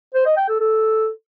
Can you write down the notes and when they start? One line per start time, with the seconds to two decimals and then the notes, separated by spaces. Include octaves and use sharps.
0.15 C5
0.26 D#5
0.37 G5
0.48 A4
0.60 A4